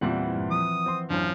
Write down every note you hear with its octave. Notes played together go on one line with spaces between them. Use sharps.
E2 A#2 E3 G3 B3 C4 E4 F#5
G2
F3 D#6
C4 C6
A1 F#2 F3 C#4 D4